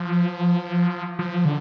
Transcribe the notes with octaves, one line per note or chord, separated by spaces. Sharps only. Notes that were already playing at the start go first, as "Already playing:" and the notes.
Already playing: F3
F3
D3